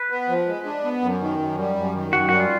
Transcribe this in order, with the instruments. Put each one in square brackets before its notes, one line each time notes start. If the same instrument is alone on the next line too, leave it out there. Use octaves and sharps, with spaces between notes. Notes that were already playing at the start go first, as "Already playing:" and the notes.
Already playing: [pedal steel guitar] B4
[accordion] B3
F3
G#3
D4
B3
F#2
D#3
F#2
G3
F#2
D#3
[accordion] F#2 [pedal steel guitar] F#4
[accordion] G3 [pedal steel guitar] F#4
[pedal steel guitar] F4